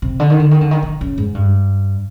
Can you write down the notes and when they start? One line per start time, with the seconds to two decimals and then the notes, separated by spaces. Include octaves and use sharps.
0.02 C3
0.20 D3
0.30 D#3
0.40 D3
0.51 D#3
0.61 D3
0.71 D#3
0.83 D3
1.01 C#3
1.18 G#2
1.35 G2